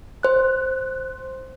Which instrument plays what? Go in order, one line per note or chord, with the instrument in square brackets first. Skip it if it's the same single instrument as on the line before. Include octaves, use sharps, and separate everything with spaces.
[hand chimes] C5 F#6